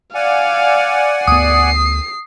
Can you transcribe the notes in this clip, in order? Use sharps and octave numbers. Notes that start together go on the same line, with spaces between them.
D5 F5 F#5 G#5
D2 B3 D#6 C7